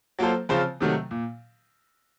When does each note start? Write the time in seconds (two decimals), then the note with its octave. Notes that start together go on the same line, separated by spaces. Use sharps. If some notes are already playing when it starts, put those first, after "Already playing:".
0.19 F#3 A#3 F4 A4 C5
0.49 C#3 F3 C4 F4 C5
0.80 C3 D#3 F#3 A3
1.11 A#2